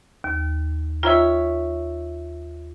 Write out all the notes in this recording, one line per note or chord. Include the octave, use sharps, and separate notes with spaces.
D#2
D#3 F4 C#5 E5